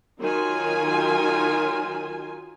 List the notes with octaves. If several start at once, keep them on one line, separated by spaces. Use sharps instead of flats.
D#3 F#3 D#4 F4 G#5